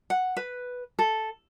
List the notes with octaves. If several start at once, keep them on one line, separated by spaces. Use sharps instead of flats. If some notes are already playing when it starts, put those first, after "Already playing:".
F#5
B4
A4